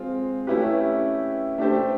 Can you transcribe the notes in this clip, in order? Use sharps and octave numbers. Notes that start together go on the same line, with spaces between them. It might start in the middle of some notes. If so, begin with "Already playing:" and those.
Already playing: G#3 C4 F4
A3 C#4 E4 G4 B4
A3 D4 G4 C5